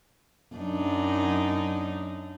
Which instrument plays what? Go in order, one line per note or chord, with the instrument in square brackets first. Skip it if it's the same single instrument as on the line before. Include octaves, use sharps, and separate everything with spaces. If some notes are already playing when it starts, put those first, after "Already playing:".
[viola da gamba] F#2 D4 D#4